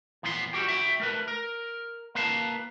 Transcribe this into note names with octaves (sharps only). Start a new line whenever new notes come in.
E2 A#2 F3 B3 A4 C6
G3 F#4 G4 G5
F#4 E5 G5
A3 A#4 B4
A#4
A#3 B4 F5 A5